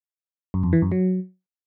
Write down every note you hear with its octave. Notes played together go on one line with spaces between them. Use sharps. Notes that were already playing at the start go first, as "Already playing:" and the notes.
F#2
F2
E3
F#2
F#3